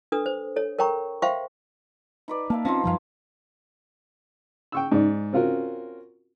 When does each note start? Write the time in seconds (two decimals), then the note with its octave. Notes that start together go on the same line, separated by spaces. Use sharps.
0.12 D4 A4 B4 D#6
0.26 C5
0.56 A4 C#5
0.79 A#4 C#5 G5 A#5 C#6
1.22 C5 E5 F5 G5 C6 C#6
2.28 D#4 B4 D5
2.50 A#3 E5 F5 A5
2.65 F3 C4 C#4 D#4 F4
2.84 F#2 F3 G3 D#4 G#4 F5
4.72 G5 C#6 E6
4.92 G#2 D5
5.33 C4 C#4 F4 F#4 A#4